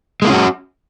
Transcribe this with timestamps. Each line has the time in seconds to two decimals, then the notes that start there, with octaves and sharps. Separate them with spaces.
0.22 G#3
0.25 A#3
0.27 F4
0.30 C#4
0.32 F#4